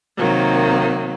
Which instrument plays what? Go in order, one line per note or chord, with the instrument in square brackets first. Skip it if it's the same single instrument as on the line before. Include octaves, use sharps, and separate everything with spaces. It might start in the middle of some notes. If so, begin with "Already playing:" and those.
[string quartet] C3 D#3 F#3 A#3